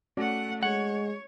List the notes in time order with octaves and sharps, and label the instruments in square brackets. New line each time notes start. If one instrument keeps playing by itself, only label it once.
[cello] A3 F#5 [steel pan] C#4 F#4 D5
[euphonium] G#3 [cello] C#5 [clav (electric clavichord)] F#5